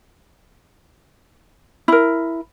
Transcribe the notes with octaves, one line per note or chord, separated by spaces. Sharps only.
E4 A#4